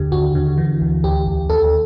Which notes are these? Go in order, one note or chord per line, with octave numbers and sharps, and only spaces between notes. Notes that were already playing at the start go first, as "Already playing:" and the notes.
Already playing: D#2 D3 G4
D#2 F#4
D3
E3
D2
D2 G4
D2
D#2 A4